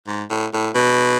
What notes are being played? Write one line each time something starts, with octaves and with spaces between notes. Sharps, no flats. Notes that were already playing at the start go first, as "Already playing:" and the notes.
G#2
A2
A2
B2